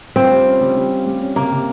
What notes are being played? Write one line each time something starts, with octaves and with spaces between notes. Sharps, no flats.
C4 F4
G3
C#4
G3
G3
F4
G3
C#4
C3 A#3
C3